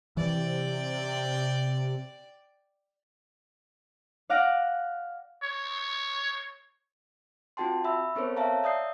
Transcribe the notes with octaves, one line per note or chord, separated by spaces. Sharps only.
C3 E3 D5 G5
D5 F5 F#5 A#6 D7
C#5
C4 F4 F#4 G5 A5 C6
E5 B5 E6
B3 C4 A4 A#4 C5 C#5
C#5 E5 F5 A5 A#5
D5 E5 D#6 G6 C7